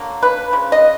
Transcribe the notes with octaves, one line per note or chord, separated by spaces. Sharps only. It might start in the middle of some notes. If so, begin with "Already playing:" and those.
Already playing: D3 F#3 A#3
B4
C#3 F3
D#5